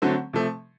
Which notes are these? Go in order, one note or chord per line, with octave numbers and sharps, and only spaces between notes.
D3 F#3 A3 C4
C3 F3 A3